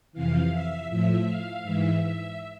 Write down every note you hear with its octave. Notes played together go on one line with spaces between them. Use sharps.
F2 C3 E3 F5
E5
A2 F3 E5
F5
G#2 E3 E5
E5